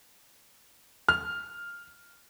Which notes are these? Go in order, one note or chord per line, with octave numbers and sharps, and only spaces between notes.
F6